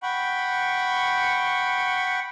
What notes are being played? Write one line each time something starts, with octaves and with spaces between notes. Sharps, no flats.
F#5 G5 B5 C#6